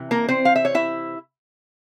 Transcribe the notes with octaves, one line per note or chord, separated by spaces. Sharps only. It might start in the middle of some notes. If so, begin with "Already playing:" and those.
Already playing: C3 E3
A#3 A#4
C4 C5
F5
E5
C#5
E4 E5